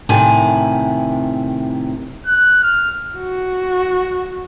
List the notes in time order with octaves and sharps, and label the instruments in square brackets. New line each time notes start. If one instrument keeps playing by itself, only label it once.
[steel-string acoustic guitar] A2 C3 D#3 E4 G#5
[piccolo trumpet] F#6
F6
[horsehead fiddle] F#4